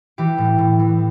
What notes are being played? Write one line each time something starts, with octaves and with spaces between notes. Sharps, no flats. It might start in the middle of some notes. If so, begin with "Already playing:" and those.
E3 G4
A2
A2
E3